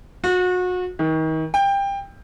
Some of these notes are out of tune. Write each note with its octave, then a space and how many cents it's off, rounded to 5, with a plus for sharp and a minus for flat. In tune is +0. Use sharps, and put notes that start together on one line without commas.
F#4 -30
D#3 +35
G5 +20